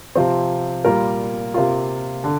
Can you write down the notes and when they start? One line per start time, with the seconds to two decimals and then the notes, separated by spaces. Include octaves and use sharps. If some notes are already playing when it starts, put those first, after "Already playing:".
0.15 C3 F3 C4
0.85 A#2 G3 A#3 F4 A#4
1.54 C3 A#3 F4
2.24 D3